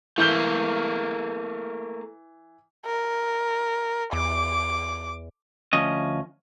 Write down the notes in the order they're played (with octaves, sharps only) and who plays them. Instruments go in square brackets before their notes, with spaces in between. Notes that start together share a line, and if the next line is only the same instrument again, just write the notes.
[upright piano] E3 G6 G7 [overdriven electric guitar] A3 A#3
[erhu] A#4
[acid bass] E2 [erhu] D6
[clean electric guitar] D2 F3 C#4 D#5